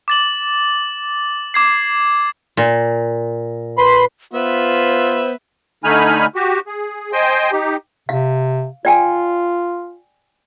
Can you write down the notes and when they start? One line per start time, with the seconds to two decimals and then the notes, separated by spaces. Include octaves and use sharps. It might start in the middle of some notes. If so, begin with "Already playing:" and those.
0.08 D6 A6 F#7
1.54 D6 G#6 C7
2.57 A#2
3.78 B4 B5 C6
4.34 B3 F4 B4 C5 E5
5.84 D3 A3 D#4 G#5 B5 F6
6.35 F#4 G4
6.67 G#4
7.12 C5 D#5 G5 G#5 C6
7.52 D#4 G4
8.09 C3 F5
8.85 F4 D5 G5 G#5